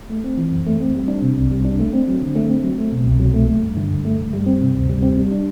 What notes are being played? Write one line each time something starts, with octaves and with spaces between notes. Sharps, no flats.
A3
C4
E3
F#2
A3
C4
G3
D4
C3
C2
G3
D4
A3
C4
F#3
D3
A3
C4
F#3
A3
B2
C2
F#3
A3
A3
G2
D3
G2
A3
G2
G3
C4
C3
D2
G3
C4
G3
D4